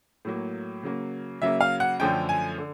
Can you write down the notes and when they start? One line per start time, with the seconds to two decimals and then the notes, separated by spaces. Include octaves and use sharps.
0.25 A2 F#3 A#3
0.83 C#3 F#3 A#3
1.41 C#3 F#3 A#3 E5
1.61 F5
1.80 F#5
2.00 F#2 D3 F3 A3 C#4 G5
2.29 G#5
2.58 D3